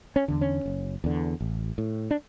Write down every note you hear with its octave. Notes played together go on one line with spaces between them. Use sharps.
C#4
E2 D3
C#4
F#1
E2 D3
A1
A2
D4